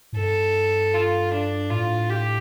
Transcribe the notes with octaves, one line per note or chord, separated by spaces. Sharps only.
A2
G2 A4
F4
D4
A2 F4
G4